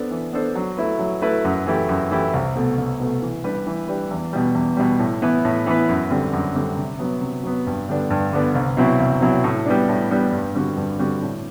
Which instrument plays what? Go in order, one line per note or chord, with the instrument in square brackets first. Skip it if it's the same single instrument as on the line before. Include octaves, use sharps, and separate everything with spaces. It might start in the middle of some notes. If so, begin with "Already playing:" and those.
Already playing: [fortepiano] B3 D4 A4 C5
E3
B3 D4 A4 C5
F#3
A3 E4 B4
F#3
A3 E4 B4
F#2
E3 A3 E4 G4
F#2
E3 A3 E4 G4
C2
B2 A3
C2
B2 A3
E3
G3 D4 G4 B4
E3
G3 D4 G4 B4
E2
B2 G3
E2
B2 G3
A2
E3 B3 E4 B4
A2
E3 B3 E4 B4
F#2
D3 G3 C4
F#2
D3 G3 C4
C3
F#3 B3
C3
F#3 B3
G2
D3 G3 B3 D4
G2
D3 G3 B3 D4
C2
B2 F#3 C4 E4
C2
B2 F#3 C4 E4
A2
G3 B3 D4
A2
G3 B3 D4
G2
D3 G3 C4 F#4
G2
D3 G3 C4 F#4
A2